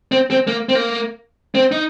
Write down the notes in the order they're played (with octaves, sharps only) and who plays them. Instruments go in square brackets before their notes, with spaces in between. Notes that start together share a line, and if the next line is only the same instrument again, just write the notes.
[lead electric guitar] C4
C4
A#3
C4
A#3
C4
D#4